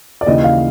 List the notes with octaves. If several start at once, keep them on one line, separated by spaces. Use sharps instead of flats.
D5
D#2 C#3 E3 D#5
F5